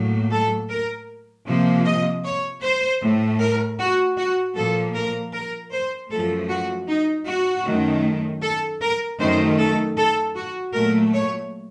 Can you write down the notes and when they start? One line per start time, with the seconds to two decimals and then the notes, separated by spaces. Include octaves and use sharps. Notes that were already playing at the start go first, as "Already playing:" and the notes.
Already playing: A2 F#3 A#3
0.31 A4
0.70 A#4
1.46 C3 F3 A#3
1.85 D#5
2.24 C#5
2.63 C5
3.02 A2 A3
3.40 A#4
3.79 F#4
4.18 F#4
4.56 A#2 F3 A#3 A4
4.95 A#4
5.33 A#4
5.72 C5
6.10 F#2 F3 A3 A4
6.49 F#4
6.88 D#4
7.27 F#4
7.65 F#2 D#3 A3
8.42 A4
8.81 A#4
9.20 F#2 D#3 A3 C5
9.59 A4
9.97 A4
10.35 F#4
10.74 A#2 F#3 A3 A#4
11.13 C#5